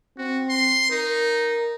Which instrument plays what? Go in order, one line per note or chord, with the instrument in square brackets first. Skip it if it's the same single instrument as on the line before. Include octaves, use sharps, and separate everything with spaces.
[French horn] C4 [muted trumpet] F#4
[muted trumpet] C6
[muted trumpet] D#4 [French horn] A#4